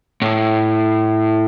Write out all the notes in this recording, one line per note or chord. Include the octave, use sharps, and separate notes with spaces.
A2